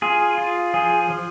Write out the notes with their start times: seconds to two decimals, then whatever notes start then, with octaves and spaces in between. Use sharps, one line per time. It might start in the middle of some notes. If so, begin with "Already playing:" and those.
0.02 F4 G#4
0.38 F4
0.74 F3 G#4
1.10 F3